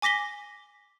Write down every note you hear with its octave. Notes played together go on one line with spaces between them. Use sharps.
G#5 D6 A#6 B6 G7